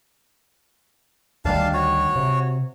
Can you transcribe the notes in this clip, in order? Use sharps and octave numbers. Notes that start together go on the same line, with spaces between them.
D2 D#3 G3 D4 F5 A5
F#4 C#5
C3